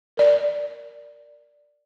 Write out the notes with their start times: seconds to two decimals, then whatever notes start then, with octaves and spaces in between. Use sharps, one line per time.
0.17 A#4 D5